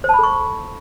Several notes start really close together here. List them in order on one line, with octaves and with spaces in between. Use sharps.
C5 A5 B5 A4 C#6